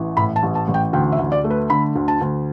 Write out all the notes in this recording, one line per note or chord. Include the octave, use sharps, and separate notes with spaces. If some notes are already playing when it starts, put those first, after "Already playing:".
Already playing: A1 E3
A2 B5
A5
A1
A5
A1
G5
D2 G5
E5
D2
D5
A3
B4
D3 B5
D2
A5
D2